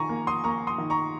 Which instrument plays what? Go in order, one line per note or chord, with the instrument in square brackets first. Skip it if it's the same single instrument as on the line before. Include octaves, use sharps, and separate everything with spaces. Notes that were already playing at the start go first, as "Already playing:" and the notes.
Already playing: [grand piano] D#3 G#5 A#5 C#6
A#3
C6 D#6
A#3 A#5 C#6
C6 D#6
D#3
A#5 C#6